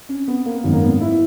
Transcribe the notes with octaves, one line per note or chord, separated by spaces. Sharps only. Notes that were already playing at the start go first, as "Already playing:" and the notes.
C#4
B3
A#3
G#1 F#2 D#3 B3
A#3
B3
E4